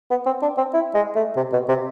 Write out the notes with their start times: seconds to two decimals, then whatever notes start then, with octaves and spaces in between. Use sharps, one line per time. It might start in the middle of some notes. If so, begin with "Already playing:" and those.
0.10 B3
0.26 C4
0.42 D4
0.58 C4
0.74 E4
0.94 G#3
1.16 A3
1.37 C3
1.53 B2
1.69 C3